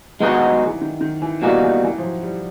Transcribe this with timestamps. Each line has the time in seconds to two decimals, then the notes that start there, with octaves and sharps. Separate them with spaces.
0.20 D#3 G#3 B3 D#4 F#4
0.35 G3
0.50 F#3
0.66 E3
0.82 D#3
1.01 D#3
1.22 E3
1.42 B2 E3 G3 A#3 D#4 F#4
1.63 E3
1.83 E3
1.98 F3
2.03 F#3
2.23 G3